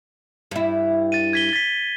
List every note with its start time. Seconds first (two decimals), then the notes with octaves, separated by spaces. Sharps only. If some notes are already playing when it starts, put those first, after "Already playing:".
0.51 G2 E4
1.12 A6 D#7
1.33 G#6 B6 G7
1.53 A6 B6